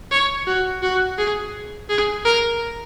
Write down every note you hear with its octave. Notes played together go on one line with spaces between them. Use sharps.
C#5
F#4
F#4
G#4
G#4
A#4